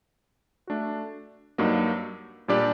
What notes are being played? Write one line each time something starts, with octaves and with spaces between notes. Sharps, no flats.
A3 D4 F#4
G2 F#3 A#3 D#4
A#2 G3 D4 G4 D5